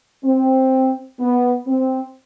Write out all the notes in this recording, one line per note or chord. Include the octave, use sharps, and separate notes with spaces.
C4
B3
C4